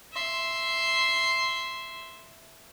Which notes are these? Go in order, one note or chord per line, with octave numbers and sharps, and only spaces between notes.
E5 C6